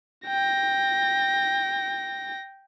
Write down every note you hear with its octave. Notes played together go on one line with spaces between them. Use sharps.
G5 A#6